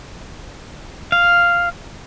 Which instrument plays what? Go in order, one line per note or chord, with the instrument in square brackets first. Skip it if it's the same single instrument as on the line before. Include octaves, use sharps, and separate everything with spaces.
[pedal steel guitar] F5